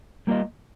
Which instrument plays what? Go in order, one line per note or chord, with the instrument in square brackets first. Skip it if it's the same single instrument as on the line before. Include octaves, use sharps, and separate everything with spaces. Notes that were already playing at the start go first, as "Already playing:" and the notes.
[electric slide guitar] G3 A#3 F4 D#5